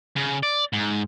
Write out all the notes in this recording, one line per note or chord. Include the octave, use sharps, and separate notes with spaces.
C#3
D5
G#2